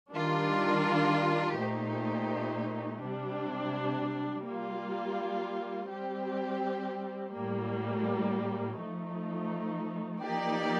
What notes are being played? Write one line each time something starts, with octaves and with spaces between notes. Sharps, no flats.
D#3 G3 D4 F4 A#4
A#2 A3 D#4 G4 C5
C3 G3 D4
G3 A#3 F4
G3 C4 G4
A2 G3 A#3
F3 A3 D#4
F3 A#3 D#4 G4 D5